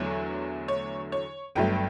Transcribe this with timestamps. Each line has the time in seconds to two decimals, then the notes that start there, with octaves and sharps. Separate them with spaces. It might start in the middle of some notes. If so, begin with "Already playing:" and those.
Already playing: E2 D3 F#3 A3 C#5
0.68 C#5
1.12 C#5
1.55 G1 G2 F#3 A3 G5